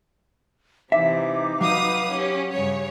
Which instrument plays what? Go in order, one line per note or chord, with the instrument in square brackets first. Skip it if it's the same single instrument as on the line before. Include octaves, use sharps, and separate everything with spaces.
[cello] C3 E3 [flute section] D#4 D6 [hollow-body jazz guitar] E5
[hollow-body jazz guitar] F#3 [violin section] B4 D#6 [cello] F5
[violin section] C#4 [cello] G4
[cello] G2 C#3 [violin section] C#5